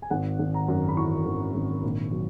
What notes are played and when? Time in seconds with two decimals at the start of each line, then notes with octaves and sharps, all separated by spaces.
0.02 G#5
0.11 G#1 F#5
0.39 G#1
0.54 A#5
0.68 F#2
0.89 B5
0.97 E3 C#6
1.26 G#1
1.55 G#1
1.83 A#1
2.12 F#3